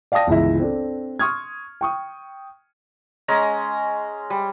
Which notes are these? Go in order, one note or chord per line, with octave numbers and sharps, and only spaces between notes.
D5 F5 G5 A5 D#6 A#6
G1 C#2 E3 E5
C4 D4 A4
C6 C#6 D#6 F6 G#6
G5 C#6 D#6
G#3 C#4 A#5
G3